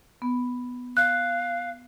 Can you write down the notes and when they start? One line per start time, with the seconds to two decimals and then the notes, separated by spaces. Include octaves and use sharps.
0.22 B3
0.97 F5 F#6